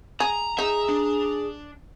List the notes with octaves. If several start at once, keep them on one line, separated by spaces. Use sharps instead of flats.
G#4 A#5
D#4 G#4 E5
D4